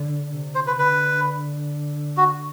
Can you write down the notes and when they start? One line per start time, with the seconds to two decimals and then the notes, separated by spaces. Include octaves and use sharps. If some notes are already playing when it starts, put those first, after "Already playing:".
Already playing: D3
0.32 C3
0.55 C5
0.67 B4
0.78 D3 B4
2.17 F#4